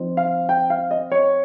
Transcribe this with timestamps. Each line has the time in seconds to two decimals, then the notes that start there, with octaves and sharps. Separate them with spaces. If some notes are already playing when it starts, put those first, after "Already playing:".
Already playing: F3 C4 D#4
0.17 F5
0.49 G5
0.70 F5
0.91 D#5
1.12 C#5